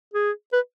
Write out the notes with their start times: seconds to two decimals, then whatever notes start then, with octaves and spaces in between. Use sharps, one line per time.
0.13 G#4
0.53 B4